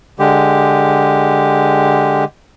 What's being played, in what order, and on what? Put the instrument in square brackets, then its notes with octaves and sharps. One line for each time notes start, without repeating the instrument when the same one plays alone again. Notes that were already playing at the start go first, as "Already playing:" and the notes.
[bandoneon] D3 G#3 G4